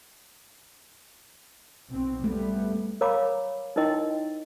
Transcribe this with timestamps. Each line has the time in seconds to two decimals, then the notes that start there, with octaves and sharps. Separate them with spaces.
1.88 B1 B2 C4
2.24 G3 A3 B3
3.01 A#4 C#5 F5 A#5 B5 D6
3.76 D#4 E4 A#4 D#5 G5 C6